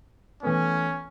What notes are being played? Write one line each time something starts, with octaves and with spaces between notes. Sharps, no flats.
E3 A3 B3 C#4